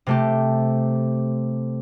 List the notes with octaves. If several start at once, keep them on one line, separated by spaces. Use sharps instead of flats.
C3 A3 G4